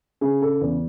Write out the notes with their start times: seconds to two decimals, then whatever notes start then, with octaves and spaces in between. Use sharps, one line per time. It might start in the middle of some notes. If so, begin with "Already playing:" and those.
0.21 C#3 G#4
0.42 A4
0.61 E2